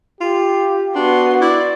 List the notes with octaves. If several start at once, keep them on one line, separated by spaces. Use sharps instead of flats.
F4 G4
B3 D4 F#4 C6
E4 D5